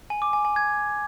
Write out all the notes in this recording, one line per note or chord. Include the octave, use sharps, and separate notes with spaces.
G#5
D6
G#5
G#5
G#6